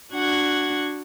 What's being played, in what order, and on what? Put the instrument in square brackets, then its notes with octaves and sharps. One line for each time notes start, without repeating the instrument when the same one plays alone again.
[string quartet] D4 F#4 F#5 G#6